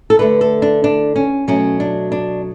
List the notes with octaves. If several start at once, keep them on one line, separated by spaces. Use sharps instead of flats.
A4
D3 A3 B4
A4
D4
D4
C#4
B2 F#3 A3 C#4
D4
D4